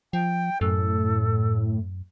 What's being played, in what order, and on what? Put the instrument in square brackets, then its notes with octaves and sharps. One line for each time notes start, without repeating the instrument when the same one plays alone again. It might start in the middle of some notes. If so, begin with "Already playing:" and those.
[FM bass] F3 [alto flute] G5
[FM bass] F#2 [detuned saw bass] A2 [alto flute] A4